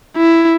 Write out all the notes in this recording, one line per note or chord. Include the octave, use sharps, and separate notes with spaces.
E4